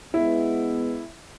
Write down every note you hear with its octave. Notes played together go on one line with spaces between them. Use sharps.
G#3 B3 E4